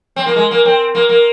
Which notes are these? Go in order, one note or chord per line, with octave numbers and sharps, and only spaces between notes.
C4
A#3
G#3
A#3
C4
A#3
A#3